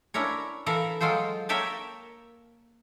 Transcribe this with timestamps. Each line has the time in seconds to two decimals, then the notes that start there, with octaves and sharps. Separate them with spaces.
0.14 C#4 D4 E4 A#4 C#5
0.66 E3 E4 A4 A#4 E5 F5
1.01 F#3 G#3 F4 A4 C5
1.49 A#3 A#4 C#5 E5 G5 A5